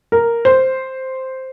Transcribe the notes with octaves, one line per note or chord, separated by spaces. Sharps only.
A#4
C5